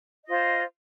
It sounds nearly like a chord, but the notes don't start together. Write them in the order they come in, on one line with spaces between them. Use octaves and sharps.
D#5 F4 C5